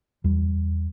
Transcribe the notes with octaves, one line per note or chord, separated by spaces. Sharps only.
E2 G3